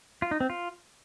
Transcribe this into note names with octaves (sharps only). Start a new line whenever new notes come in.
F4
D#4
C4
F4